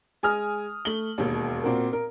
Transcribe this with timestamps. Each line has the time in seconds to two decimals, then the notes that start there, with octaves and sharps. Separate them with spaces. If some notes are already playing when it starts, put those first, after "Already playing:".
0.23 G#3 G#5 D#6 F6
0.85 A3 F#7 G7
1.18 E1 D#2
1.64 A#2 C4 F#4 A#4
1.93 A#4